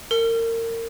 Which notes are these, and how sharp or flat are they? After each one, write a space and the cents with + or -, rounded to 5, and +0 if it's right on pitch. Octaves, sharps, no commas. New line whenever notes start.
A#4 -30